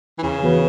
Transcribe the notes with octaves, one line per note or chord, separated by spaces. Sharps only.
E3
E2 C#3
E3 B3 F#4 B4